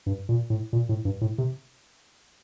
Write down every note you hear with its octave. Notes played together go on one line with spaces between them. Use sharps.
G2
A#2
A2
A#2
A2
G2
A2
C3